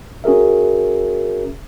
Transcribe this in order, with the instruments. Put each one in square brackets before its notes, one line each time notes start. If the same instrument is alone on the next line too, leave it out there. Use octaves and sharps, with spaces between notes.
[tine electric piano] C#4 F#4 G#4 A#4 E5